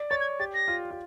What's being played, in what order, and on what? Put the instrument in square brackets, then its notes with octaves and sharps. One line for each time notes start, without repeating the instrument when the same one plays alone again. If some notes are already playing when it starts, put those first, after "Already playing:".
Already playing: [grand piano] D5
[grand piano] C#5 [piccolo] A6
[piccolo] G#6
[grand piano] G4 [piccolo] A6
[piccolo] A#6
[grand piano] F4
F4